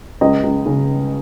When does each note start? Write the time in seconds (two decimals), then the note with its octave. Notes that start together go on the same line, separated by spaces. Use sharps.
0.21 C#2 D#5
0.43 C#2
0.66 C#3